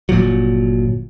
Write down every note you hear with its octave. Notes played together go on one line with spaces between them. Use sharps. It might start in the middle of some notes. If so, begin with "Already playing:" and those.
G1 A#2 F3 F#3